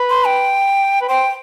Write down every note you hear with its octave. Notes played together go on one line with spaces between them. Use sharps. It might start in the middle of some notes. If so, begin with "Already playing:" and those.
Already playing: B4
C6
G5
B4
C5 G5